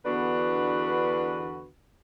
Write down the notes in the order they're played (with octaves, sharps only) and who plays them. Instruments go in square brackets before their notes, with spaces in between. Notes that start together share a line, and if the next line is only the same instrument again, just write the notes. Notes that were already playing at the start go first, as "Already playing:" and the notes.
[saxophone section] E2 D3 B3 D4 F#4 B4